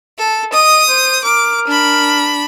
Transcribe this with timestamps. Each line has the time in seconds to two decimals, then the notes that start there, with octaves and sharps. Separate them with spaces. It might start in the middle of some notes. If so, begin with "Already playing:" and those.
0.18 A4
0.53 D#5 D#6
0.89 C5
1.24 A#4 D6
1.68 D4 B5